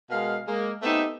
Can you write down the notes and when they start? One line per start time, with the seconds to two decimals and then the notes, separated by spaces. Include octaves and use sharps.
0.11 B2 G#3 A#4 F5
0.48 G#3 A#3
0.83 A3 B3 C4 D#4 G4 E5